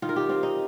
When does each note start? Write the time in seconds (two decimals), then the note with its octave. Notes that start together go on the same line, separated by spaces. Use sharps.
0.02 D#3 F4
0.09 A#4
0.16 G4
0.29 C4 F4
0.43 D#4